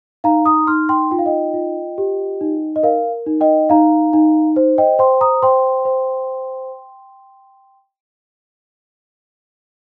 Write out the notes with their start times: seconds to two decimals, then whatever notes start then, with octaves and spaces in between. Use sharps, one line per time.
0.24 D#4 F5 A#5
0.46 A#5 D#6
0.67 D#4 C6 F6
0.89 G5 C6
1.11 F4 G5
1.19 F5
1.26 D#5 G5
1.54 F4
1.98 G4
2.41 D#4
2.76 D#5
2.83 A#4 F5
3.26 D#4
3.41 D#5 G5
3.69 D#4 F5 A#5
4.13 D#4
4.56 C5
4.78 D#5 G5
4.99 C5 G5 C6
5.21 A#5 D#6
5.42 C5 G5 C6
5.85 C5